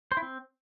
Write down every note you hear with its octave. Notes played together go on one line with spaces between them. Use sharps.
C5
E4
C4